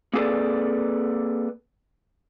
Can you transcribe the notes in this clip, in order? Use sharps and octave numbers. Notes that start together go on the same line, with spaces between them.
A#3 C4 G#4 A4 B4 D5